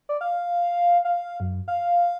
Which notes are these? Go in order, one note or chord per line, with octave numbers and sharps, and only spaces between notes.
D5
F5
F5
F#2
F5